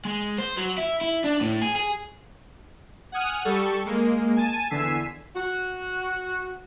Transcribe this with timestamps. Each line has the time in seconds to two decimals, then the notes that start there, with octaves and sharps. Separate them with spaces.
0.05 G#3
0.38 C5
0.57 F#3
0.78 E4
1.01 E4
1.24 D4
1.41 A2
1.62 G#4
1.75 G#4
3.12 F#5 G#5 D#6 F6
3.45 G3 A4 C#6
3.86 G#3 A#3
4.36 G#5 A5 D#7
4.70 E2 D3 G#5 E6 B6 C7
5.35 F#4